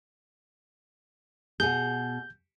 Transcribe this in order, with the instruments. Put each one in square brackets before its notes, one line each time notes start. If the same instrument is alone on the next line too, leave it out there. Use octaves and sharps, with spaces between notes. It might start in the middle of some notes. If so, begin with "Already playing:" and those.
[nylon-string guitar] B2 G#4 [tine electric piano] G6